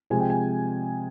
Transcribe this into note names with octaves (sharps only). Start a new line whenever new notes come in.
C3 F3 G#3 G#5
G5
G#5